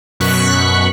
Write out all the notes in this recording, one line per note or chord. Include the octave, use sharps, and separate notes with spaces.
F#2 B2 C#6 F#6 B6